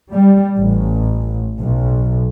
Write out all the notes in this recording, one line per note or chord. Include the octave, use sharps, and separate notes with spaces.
G3
A1
B1